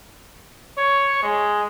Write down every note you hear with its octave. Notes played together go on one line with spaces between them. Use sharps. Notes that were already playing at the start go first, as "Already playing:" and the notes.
C#5
G#3